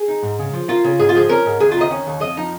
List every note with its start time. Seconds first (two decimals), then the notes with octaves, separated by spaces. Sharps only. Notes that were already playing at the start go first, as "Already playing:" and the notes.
Already playing: G#4
0.08 D#4
0.23 G#2
0.39 C#3
0.53 F3
0.68 A#3 F4
0.84 C#3
0.99 G#2 G#4
1.09 F4
1.15 F3 G#4
1.29 C#4 A#4
1.45 G#2
1.60 D#2 G#4
1.71 F4
1.76 D#3 D#5
1.91 C#4
2.07 D#2
2.21 F2 D#5
2.37 F3 D#4